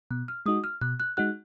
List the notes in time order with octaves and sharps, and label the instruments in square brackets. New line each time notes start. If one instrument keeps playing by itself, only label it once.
[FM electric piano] B2 [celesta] F#6
[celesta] F6
[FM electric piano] G#3 D#4 F#4 [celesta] D#6
[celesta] F6
[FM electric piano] B2 [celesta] F#6
[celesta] F#6
[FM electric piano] G#3 D#4 F#4 [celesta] F#6